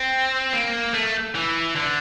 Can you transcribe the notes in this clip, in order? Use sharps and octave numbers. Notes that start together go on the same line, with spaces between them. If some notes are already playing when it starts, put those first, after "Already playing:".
Already playing: C4
A#3
A3
E3
D3